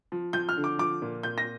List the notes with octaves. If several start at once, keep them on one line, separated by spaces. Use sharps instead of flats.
F3
F3 G6
F6
D3
D6
F3 D6
A#2
A#2 G6
A#6